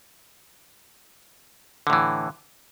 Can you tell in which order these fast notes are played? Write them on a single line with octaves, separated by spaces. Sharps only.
D3 A2 E3